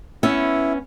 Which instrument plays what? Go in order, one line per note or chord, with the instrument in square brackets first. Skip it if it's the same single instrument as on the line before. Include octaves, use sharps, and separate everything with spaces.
[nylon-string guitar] B3 C#4 E5 [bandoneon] E4